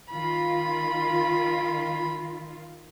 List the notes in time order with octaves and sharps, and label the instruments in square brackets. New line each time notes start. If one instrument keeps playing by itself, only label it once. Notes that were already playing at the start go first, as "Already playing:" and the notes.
[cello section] D#3 F4 [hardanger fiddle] B5